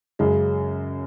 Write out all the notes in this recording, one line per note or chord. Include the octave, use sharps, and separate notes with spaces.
F#2 C#3 G#3